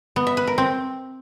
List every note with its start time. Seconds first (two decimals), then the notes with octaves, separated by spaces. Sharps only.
0.16 B3
0.27 E5
0.37 B4
0.47 A#4
0.58 C4